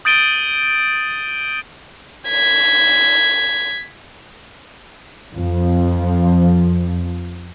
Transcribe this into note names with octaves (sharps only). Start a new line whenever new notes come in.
D#6 G6 A6 D7 D#7 G7
G#6 B6
F2 F3